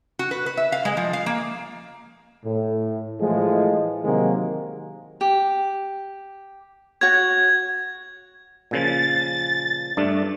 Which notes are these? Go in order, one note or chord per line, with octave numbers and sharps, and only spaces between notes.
F#4
B4
B4
E5
F5
G#3
F3
F5
A#3
A2
A2 E3 F3 G#3
C3 D#3 F#3 G#3 A#3
G4
F#4 C#5 G#6
A#2 C#3 F3 A6
G2 A3 D4